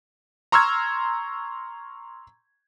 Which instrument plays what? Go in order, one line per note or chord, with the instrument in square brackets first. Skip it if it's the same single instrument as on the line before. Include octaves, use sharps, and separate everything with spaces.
[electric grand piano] A#5 C6 C#6 E6 F6 G#6